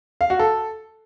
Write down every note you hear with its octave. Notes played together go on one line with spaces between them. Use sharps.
F5
F#4
A4